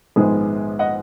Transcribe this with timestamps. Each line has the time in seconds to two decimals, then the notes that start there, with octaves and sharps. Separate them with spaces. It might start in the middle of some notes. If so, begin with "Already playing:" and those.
0.16 A#1 G#2 D#3 G#3 B3 G#4
0.79 D#5 F#5